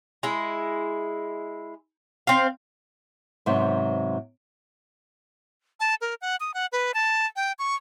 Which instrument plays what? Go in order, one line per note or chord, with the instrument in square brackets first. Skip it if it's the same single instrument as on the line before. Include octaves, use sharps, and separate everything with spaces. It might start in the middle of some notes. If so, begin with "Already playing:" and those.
[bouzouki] G#3 E4
C4 F5
[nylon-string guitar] G#2 C3 F#3 B3 C4
[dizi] A5
A#4
F#5
D#6
F#5
B4
A5
G5
C#6